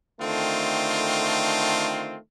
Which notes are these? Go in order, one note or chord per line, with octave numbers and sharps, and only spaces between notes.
D3 D#3 A3 C4 F4